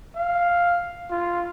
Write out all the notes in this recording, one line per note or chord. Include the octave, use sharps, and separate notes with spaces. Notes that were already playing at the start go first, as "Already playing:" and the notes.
F5
F4